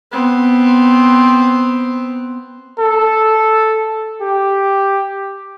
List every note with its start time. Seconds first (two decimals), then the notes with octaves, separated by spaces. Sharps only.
0.12 B3 C4
2.80 A4
4.22 G4